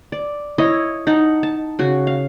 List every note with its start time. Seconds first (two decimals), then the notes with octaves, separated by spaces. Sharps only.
0.12 D5
0.58 E4 C#5 D#5
1.07 D#4 F#5 A5
1.43 A5
1.79 C#3 F#4
2.07 F5